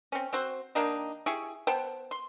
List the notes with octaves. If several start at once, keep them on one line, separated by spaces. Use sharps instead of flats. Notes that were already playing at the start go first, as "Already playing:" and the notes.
C4 C#4
C4 F#4 C5
D#3 A#3 D4 D#4
E4 G4 G#4 C#6
B3 C5 G5 A5
C6